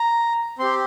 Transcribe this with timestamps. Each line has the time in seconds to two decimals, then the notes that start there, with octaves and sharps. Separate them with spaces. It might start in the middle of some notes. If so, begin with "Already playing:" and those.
Already playing: A#5
0.59 C4 G4 C6